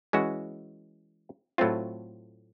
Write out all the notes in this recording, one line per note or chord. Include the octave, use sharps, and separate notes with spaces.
E3 G#3 C#4 F#4
A2 F#3 A3 C4 F4